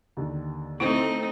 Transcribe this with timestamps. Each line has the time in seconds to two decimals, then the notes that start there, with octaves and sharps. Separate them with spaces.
0.17 D#2 D3 D#3
0.80 A3 C4 D#4 E4